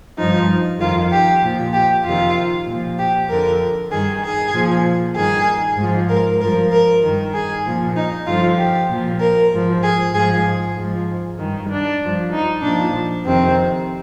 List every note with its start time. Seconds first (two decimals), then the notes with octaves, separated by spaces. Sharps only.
0.18 G2 F3 D#4
0.79 F2 D#3 F4
1.11 G4
1.42 A#2 F3
1.73 G4
2.04 F2 C3 D#3 F4
2.66 A#2 F3
2.98 G4
3.29 F2 D3 F3 A#4
3.91 G2 D#3 G#4
4.23 G#4
4.53 A#2 F3
5.15 G2 D#3 G#4
5.77 G#2 F3
6.09 A#4
6.40 G2 F3 A#4
6.71 A#4
7.02 G2 D#3
7.33 G#4
7.65 A#2 F3
7.95 D#4
8.26 G2 D3 F3 F4
8.58 G4
8.88 A#2 F3
9.19 A#4
9.51 G#2 F3
9.82 G#4
10.13 G#2 F3 G#4
10.75 G#2
10.80 F3
11.38 G2 D#3
11.69 D4
12.01 G2 F3
12.31 D#4
12.62 A#2 F3 D4
13.24 F2 C3 D#3 C4